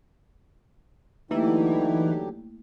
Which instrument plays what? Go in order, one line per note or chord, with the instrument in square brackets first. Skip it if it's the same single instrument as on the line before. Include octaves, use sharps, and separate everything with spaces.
[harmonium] D3 F#3 G4 [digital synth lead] E3 [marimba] A3 A#3 E4 [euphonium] D#4